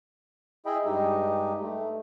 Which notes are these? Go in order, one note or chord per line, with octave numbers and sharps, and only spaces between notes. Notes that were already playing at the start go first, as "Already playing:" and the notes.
E4 G#4 D#5 E5 G5 B5
G2 G#3 D#4 G4
A3